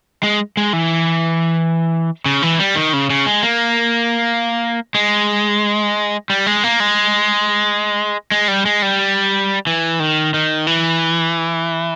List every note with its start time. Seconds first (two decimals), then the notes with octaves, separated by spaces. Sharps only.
0.23 G#3
0.57 G#3
0.73 E3
2.26 C#3
2.42 E3
2.59 G3
2.76 D#3
2.93 C#3
3.10 C#3
3.26 G#3
3.43 A#3
4.95 G#3
6.30 G3
6.46 G#3
6.64 A#3
6.80 G#3
8.32 G#3
8.48 G3
8.65 G#3
8.82 G3
9.67 E3
10.00 D#3
10.34 D#3
10.67 E3